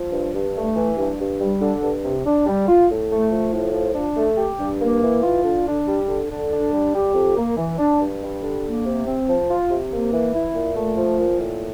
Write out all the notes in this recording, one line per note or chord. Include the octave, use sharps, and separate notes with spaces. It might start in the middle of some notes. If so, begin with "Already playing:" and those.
Already playing: F3
G2
G2
A3
E3
G2
G2
G3
D3
G2
C3
D4
G3
F4
A2
A3
F3
A2
F3
D4
A3
G4
G2
A#3
E3
F4
D3
D4
G3
D3
D3
D4
G3
G4
F2
A#3
E3
D4
G2
G3
D3
A#3
C3
C4
F3
F4
C3
A#3
E3
E4
A#2
A3
F3
A#2
A2